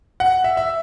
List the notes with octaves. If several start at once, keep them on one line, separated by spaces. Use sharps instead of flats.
F#5
E5
E5